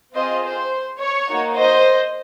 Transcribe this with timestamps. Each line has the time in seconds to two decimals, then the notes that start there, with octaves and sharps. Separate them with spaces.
0.15 C4 F4 G#4 C5 D#5
0.43 C5
1.00 C#5
1.28 A#3 D#4 F#4
1.56 C5 D#5